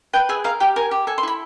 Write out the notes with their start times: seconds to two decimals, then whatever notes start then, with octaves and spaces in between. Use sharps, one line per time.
0.13 B4 G5
0.29 G#4 E5
0.44 A#4 F5
0.60 G4 G5
0.76 A#4 G#5
0.91 G4
1.07 A4 G#5
1.18 C6
1.23 E4 B5